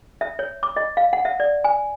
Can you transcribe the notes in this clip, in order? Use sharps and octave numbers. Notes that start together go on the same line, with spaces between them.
E5
C#5
D6
D#5
F5
F#5
E5
D5
G#5